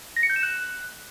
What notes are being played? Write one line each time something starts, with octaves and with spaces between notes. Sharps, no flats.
A#6
C#7
G6
E7
F#6